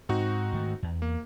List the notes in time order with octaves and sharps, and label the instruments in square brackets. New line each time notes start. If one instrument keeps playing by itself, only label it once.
[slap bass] G#2 [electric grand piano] C4 D#4 F#4
[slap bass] G#2 D#3 A3
E2
[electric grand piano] A#3